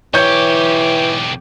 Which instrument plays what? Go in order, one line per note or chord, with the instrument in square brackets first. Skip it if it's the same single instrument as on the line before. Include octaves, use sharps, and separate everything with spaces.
[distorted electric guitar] B1 G4 [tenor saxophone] E3 [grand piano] C#5 G6 C#7